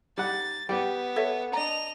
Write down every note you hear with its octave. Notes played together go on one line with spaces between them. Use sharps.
G3 D#4 F#5 A6
G3 B3 G4 G5
A4 C#5 E5
D4 D5 D#5 A#5 F7